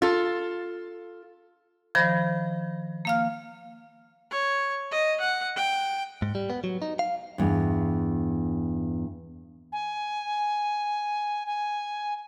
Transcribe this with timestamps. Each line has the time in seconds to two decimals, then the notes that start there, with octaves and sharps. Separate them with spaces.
0.02 F4 A4
1.95 D#3 F3 C5 B5 A#6
3.05 A#3 F5 F6
4.31 C#5
4.91 D#5
5.20 F#5
5.56 G5
6.22 G#2
6.35 G3
6.50 B3
6.64 F#3
6.82 D#4
6.99 F5
7.38 E2 G2
9.72 G#5
11.46 G#5